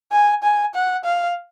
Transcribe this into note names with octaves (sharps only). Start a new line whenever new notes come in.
G#5
G#5
F#5
F5